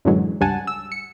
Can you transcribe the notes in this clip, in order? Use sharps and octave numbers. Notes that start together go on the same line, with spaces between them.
F#2 A2 D3 E3 F#3 G#3
C#2 G2 G3 F#5 G#5 A5
E6
C#7